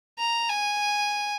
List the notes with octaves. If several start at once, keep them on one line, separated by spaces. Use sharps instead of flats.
A#5
G#5